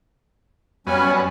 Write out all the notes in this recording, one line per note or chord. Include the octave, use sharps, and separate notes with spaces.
F#2 G3 B3 C#4 G#5